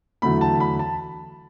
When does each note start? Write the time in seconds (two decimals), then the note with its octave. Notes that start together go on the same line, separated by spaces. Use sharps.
0.22 E2 D3 F#3 A3 B5
0.41 A5
0.60 B5
0.79 A5